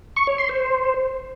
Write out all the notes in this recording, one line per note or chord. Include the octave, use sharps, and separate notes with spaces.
C#6
C#5
C6
C5